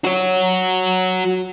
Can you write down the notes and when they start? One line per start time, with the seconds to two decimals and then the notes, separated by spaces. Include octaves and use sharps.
0.05 F#4 C#5